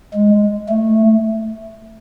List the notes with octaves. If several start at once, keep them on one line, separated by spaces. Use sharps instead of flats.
G#3
A3